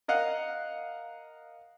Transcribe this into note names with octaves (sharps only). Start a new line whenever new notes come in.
A#4 D#5 F5 F#5